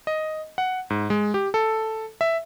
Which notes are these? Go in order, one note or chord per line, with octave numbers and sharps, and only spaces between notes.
D#5
F#5
G#2
G#3
G4
A4
E5